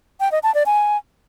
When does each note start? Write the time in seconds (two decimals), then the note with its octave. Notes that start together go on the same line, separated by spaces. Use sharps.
0.20 G5
0.32 D#5
0.43 A5
0.55 D5
0.66 G#5